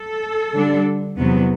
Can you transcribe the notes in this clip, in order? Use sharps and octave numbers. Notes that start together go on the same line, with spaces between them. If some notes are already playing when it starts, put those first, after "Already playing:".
Already playing: A4
D3 G3 D4
E2 C3 F#3 B3